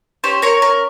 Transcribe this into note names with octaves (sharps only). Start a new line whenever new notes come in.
C#4 G4 C5
A#4 C#5
A#4